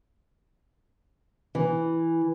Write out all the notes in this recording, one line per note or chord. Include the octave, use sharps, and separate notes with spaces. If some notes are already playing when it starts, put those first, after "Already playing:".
E3